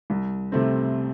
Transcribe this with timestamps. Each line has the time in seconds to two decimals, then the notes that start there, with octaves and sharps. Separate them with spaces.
0.10 C2
0.52 C3 A3 C4